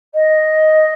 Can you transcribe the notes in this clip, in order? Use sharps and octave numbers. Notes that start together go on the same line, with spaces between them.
D#5